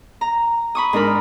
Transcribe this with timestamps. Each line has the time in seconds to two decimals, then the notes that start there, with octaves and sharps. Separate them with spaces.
0.21 A#5
0.75 B5 C#6 D#6
0.93 G#2 D4 A#4 B5